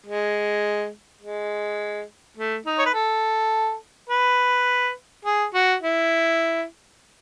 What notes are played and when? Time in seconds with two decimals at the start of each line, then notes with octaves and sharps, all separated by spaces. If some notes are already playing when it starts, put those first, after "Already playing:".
0.06 G#3
1.22 G#3
2.37 A3
2.66 D#4
2.79 C#5
2.86 B4
2.94 A4
4.09 B4
5.25 G#4
5.54 F#4
5.83 E4